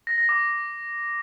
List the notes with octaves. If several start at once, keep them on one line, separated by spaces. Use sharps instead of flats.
A#6
A#6
D6